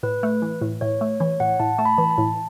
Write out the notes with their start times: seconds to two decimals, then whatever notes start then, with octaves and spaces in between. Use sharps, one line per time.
0.03 A2 B4
0.23 A3
0.42 E3
0.61 A2
0.81 A2 C#5
1.01 A3
1.20 E3 C#5
1.40 A2 F#5
1.60 A2 A5
1.78 A3 A5
1.85 B5
1.98 E3
2.11 A5
2.18 A2